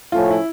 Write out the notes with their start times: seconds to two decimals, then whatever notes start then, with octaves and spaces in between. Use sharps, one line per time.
0.12 A2 F3 A3 C#4 F4
0.30 E4